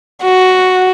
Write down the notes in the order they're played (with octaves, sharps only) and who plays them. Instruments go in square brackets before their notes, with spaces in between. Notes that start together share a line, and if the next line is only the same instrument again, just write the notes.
[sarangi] F#4